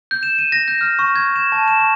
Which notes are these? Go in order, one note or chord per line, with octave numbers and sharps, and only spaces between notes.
G6
E7
D#7
A#6
G6
F6
C#6
G#6
E7
A5
E7
C#6